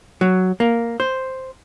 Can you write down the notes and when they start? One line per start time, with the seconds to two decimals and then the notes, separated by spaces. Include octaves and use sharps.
0.21 F#3
0.60 A#3
1.00 C5